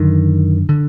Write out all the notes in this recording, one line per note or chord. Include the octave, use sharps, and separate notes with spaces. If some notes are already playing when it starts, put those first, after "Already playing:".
Already playing: F#2 D3 D#3
D3